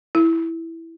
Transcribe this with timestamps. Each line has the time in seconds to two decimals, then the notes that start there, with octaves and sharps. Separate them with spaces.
0.15 E4